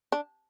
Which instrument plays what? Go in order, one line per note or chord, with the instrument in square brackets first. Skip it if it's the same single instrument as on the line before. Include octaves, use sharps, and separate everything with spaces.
[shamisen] D4